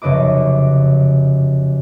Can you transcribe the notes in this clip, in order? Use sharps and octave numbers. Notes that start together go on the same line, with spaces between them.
F1 F#2 C#3 B4 D#5 D6